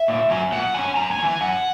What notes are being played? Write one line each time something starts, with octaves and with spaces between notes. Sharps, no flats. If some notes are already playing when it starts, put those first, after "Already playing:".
Already playing: E5
A#2
F#3 C#4
A#2 F#5
F#3 C#4 G#5
F#2 A#5
G#5
B3
E3 G#5
F#2 F#5